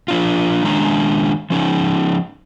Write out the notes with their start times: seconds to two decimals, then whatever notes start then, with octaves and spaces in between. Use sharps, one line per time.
0.08 F3 D4 F4
0.64 D#3 G#3 C#4 D4 A#5
1.50 F3 C#4 D#4